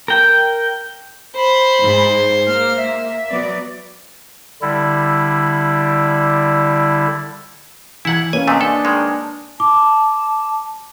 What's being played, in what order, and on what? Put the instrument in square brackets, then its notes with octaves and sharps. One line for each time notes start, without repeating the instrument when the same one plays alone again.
[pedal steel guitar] A#4 G5
[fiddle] C5 [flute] B5
[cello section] G#2
[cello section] A#3 [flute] F6
[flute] E5
[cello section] F#3 B3 D5
[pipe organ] D3 G3 E4
[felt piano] E3 G#6 [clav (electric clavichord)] E4 F#5
[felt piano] A#3 B4 C#5 [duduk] C#4 [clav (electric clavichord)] G#5
[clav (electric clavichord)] D#2 C3 A3 [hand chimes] G#5 D#6
[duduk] D4 [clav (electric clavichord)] A4
[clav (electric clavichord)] D#3 G#3
[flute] A5 [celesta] D6